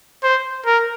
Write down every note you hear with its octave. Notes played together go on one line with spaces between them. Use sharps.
C5
A#4